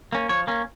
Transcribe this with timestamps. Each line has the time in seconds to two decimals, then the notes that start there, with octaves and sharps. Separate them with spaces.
0.12 A#3 C#4
0.29 F3 C#5
0.47 A#3 C#4